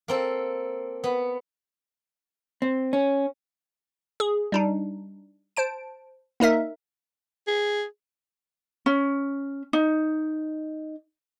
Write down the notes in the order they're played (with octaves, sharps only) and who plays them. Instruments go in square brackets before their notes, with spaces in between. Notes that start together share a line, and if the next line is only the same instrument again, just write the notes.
[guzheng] A#3 C4 A4
B3
[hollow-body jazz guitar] C4
C#4
[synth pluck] G#4
G3 D4 D#4
C5 A5 D7
A#3 D#4 A#4 E5
[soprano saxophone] G#4
[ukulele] C#4
D#4